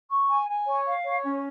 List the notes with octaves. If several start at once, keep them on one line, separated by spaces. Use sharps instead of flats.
C#6
G#5
G#5
C#5
F5
C#5
C#4